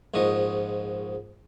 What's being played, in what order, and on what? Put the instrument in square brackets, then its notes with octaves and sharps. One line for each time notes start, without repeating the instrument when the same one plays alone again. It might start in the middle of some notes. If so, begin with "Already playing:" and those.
[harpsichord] A#1 G#2 F3 D#5 C#6